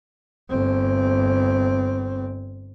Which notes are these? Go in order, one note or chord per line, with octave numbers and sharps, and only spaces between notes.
G1 C4